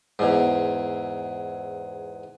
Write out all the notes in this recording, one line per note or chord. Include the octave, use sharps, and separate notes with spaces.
E2 G#2